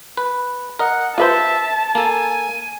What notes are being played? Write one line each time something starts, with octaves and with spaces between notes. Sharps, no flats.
B4
A#4 D#5 F#5
F4 B4 C5 E5 A5
A#3 A4 G#5